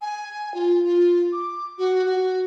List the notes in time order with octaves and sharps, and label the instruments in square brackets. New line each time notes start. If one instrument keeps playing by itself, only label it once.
[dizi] G#5
F4
F4
D6
F#4
F#4